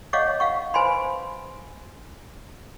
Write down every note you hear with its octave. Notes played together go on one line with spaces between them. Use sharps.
C#5 D#5 F5 F#5 C#6 D6
F5 F#5 C#6
B4 C5 G#5 B5 C6